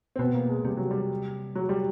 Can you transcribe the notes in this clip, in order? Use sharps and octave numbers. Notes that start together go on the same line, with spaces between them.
C4
B2 B3
A#3
G#3
C3 G3
F#3
G3
F#3
G3